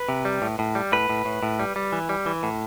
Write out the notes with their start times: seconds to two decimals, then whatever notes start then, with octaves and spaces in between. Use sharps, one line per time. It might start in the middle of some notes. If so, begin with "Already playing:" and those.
Already playing: B4
0.09 C3
0.25 G3
0.42 A2
0.59 A2
0.75 G3
0.92 A2 B4
1.09 A2
1.25 A2
1.43 A2
1.59 G3
1.76 G3
1.92 E3
2.09 G3
2.26 E3
2.43 A2